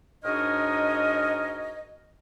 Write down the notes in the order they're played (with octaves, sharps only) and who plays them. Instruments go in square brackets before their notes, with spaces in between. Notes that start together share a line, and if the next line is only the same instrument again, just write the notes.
[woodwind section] G#2 D4 F#4 A#4 C#5 D#5